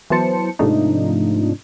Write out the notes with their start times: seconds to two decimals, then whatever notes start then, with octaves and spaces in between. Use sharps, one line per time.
0.10 E3 F#3 B3 C5 A5 C#7
0.59 G#2 C3 F3 A3 D4 D#4